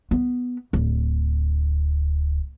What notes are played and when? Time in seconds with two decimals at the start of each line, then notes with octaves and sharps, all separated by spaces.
0.11 B3
0.73 D1